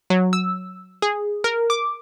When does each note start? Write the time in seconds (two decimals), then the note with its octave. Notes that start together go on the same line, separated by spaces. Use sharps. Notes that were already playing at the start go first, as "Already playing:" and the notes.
0.10 F#3
0.33 E6
1.02 G#4
1.44 A#4
1.70 D6